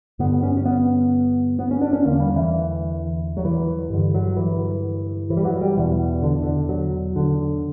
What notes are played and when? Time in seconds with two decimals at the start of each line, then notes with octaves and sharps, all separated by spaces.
0.19 G2 D3 B3
0.43 C#4
0.57 C#4
0.65 B3
1.59 B3
1.71 C#4
1.81 D4
1.93 C#4
2.05 E2 D3 A#3
2.20 G3
2.36 E3
3.37 F#3
3.45 E3
3.90 G2 D3
4.14 F#3
4.37 E3
5.30 E3
5.37 G3
5.45 F#3
5.61 G3
5.76 E2 B2 E3
6.22 D3
6.42 D3
6.69 F#3
7.16 D3